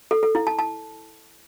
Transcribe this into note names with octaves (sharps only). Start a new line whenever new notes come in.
A4
A4
E4
A5
A5